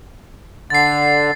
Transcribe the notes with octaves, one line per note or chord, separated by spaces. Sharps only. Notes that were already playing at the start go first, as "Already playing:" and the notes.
D3 A6 C7